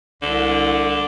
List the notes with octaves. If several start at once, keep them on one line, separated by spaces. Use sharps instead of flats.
C2 D3